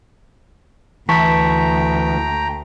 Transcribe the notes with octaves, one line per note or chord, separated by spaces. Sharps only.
D2 E3 G5 A5 A#5 C#6 B6